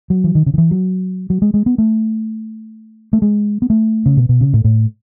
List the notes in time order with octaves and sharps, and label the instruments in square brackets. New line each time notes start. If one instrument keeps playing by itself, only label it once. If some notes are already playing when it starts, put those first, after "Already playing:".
[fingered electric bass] F#3
E3
D#3
C#3
D#3
E3
F#3
F#3
G#3
G#3
B3
A3
A3
G#3
B3
A3
C#3
B2
B2
C#3
A2
A2